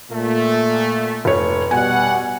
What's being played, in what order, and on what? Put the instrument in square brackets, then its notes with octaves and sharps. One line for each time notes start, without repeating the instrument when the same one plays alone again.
[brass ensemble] A#2 A3
[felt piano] F1 C#5
[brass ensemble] B2 G3 F#5 [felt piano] G#5